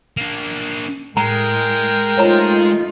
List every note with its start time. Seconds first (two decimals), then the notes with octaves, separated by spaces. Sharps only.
0.17 A#3 D4
1.17 A2 G#3 A#4 G5 A#5
2.18 A3 D#4 F4 C5 C#5 A#5